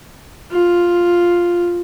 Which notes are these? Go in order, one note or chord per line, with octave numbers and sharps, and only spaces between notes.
F4